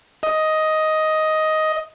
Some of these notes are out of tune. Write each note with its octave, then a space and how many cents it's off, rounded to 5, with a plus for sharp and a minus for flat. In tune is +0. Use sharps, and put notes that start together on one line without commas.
D#5 +10